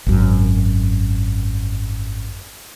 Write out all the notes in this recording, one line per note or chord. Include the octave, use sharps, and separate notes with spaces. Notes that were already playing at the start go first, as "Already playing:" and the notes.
G#1 F#2